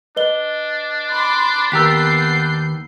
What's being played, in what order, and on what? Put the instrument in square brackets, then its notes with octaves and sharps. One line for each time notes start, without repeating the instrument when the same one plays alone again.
[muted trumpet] D4 [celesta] B4 D#5 G7
[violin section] B5 C6 D6
[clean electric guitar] D#2 G4 A#4 [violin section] B3 G6 C7 [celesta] E6 B6